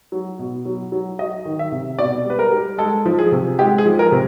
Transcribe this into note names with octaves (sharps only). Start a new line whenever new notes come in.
F#3
B2
F#3
F#3
F#3 D#5
D#3
E5
C3
B2 D5
G3 B4
A#4
G3
G#3 A4
F3
G#4
C3
G#3 G4
G#4
F3
A#4
C3